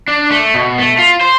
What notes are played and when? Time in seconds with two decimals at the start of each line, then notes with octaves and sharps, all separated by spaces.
0.08 D4
0.31 A3
0.54 B2
0.78 A3
0.99 F4
1.21 C5